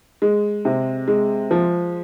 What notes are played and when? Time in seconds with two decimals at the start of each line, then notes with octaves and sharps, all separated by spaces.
0.22 G#3
0.65 C3
1.08 G#3
1.51 F3